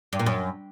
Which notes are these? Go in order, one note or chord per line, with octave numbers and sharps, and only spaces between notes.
G2
A#2
F#2